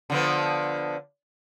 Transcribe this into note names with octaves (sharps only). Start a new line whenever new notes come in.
D3 F3 B3